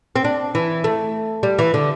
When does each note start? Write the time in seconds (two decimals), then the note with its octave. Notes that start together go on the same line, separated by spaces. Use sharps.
0.16 C4
0.24 D4
0.55 E3
0.84 A3
1.43 G3
1.59 E3
1.74 D3